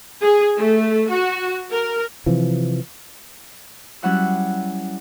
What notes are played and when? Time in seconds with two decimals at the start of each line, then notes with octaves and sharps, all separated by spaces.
0.22 G#4
0.57 A3
1.10 F#4
1.72 A#4
2.26 C3 E3 F3
4.02 F#3 G3 C#4 E4 F#5 E6